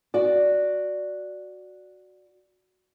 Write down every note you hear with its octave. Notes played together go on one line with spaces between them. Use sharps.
F#4 D5